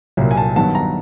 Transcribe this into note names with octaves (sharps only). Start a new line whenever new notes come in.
C2 A#2 F#3 A#3
G#5
A5
G2 D#3 F#3 B3 A5
A#5